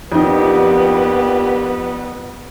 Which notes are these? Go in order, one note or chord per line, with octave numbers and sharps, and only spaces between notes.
F2 A#3 B3 D4 D#4 G4